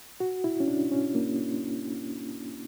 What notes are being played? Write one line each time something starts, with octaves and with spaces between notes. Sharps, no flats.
F#4
E4
C#4
D4
C#4
A#3